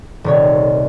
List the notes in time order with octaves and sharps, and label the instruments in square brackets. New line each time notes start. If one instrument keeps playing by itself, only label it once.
[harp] D#1 C2 C#5